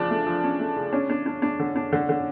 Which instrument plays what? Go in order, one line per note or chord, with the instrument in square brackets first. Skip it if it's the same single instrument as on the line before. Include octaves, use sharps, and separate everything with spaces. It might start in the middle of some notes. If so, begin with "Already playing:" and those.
Already playing: [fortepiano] C#3 F3 [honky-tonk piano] D4
[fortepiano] A3
F3
C#4
A3
C#3
[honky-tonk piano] C#4 [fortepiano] D4
[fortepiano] D4
D4
D4
D3
D4
D3
D3